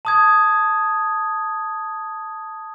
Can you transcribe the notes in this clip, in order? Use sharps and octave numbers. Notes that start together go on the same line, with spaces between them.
A5 D#6 G#6